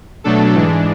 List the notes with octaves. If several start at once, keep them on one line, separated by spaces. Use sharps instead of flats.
B2 F#3 A3 D4 A4
G#2 E3 G#3 D4